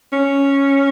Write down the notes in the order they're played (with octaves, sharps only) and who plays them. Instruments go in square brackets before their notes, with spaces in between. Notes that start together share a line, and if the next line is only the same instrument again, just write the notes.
[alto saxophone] C#4